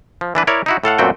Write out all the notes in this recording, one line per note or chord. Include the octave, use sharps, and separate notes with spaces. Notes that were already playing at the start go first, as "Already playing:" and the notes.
F3
E3 D4 B4
E4 A#4 C#5 D5
D#4 E4 F#4
A2 A4 F5 F#5
F#2 A#2 A3 C4 F#4 G5